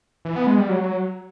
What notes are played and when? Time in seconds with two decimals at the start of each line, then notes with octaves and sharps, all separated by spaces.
0.25 E3
0.36 B3
0.47 G#3
0.58 G3
0.69 F#3